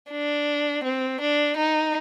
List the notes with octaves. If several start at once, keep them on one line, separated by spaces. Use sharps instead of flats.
D4
C4
D4
D#4